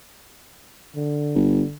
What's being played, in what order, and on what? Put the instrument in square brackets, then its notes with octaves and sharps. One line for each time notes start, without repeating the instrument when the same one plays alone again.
[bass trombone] D3
[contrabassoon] G1